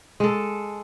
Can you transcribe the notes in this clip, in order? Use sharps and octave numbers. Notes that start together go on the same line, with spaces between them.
G#3 A4